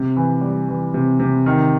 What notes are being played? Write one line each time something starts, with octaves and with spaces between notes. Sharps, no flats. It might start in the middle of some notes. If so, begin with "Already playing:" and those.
Already playing: C3
E3
G3
E3
C3
C3
D#3